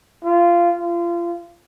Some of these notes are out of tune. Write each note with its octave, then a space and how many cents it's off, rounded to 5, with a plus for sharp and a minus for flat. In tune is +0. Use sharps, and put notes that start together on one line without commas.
F4 -15
F4 -30